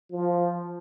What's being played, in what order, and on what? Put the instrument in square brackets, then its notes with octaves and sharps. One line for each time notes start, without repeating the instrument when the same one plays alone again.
[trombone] F3